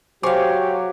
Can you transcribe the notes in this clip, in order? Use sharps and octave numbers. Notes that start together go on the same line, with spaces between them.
F#3 G4 G#4 C5 F5 C#6 D6